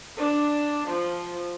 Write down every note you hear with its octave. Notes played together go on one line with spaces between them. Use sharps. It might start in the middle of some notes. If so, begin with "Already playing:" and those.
D4
F3